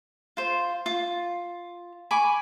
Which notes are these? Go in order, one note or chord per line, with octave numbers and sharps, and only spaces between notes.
F4 C5
F4
G#5 B5 C#6 D6